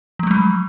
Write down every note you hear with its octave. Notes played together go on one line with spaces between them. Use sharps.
F3 F#3 G#3 A3